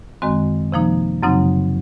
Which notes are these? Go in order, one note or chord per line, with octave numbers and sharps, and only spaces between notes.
F#2 D#3 G#3 C4 F#4
C3 F3 A#3 D#4
F#2 C#3 F#3 C4 D#4